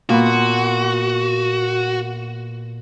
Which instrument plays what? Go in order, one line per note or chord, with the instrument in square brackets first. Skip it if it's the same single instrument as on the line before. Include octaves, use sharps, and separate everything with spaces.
[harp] A#2 B3 [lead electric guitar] F#4